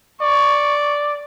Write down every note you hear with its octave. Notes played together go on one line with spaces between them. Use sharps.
D5 C#6